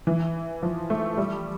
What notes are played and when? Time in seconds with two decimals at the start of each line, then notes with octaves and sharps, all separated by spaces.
0.07 E3
0.63 F3
0.90 A3
1.17 G3